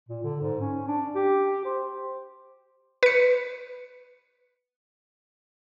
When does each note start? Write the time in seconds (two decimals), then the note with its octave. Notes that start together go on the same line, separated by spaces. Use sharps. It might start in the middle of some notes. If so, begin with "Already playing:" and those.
0.09 A#2
0.23 D3
0.41 G#2
0.60 C#4
0.87 D4
1.15 G4
1.65 C5
3.03 B4 C#7